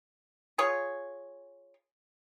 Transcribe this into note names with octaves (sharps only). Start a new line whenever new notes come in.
F4 G#4 C#5